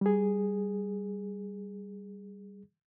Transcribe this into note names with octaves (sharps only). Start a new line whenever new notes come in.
G3 G#4